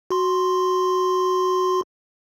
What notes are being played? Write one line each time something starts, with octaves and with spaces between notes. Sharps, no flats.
F#4 C6